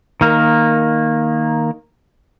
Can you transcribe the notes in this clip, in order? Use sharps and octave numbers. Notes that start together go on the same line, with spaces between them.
D#3 A#3